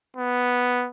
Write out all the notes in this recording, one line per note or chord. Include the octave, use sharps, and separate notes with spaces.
B3